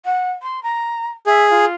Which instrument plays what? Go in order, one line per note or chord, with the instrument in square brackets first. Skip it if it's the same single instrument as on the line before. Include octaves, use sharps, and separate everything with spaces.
[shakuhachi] F#5
C6
A#5
[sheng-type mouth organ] G#4 [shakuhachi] E5
[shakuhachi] F4